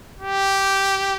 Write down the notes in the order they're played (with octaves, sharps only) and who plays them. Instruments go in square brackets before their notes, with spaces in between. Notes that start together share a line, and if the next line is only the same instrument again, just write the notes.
[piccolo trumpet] G4